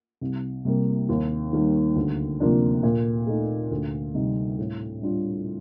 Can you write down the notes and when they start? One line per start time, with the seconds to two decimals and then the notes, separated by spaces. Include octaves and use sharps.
0.21 C2
0.65 C3 G3 A#3
1.09 D#2
1.53 D#3 G3 A#3
1.96 D2
2.40 C3 F3 A#3 D4
2.83 A#2
3.27 A3 D#4
3.71 D2
4.14 C3 G3 C4 D#4
4.58 A2
5.02 G3 D4 F4